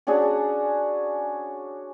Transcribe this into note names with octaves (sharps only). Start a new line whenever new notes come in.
C#4 D4 F#4 G#4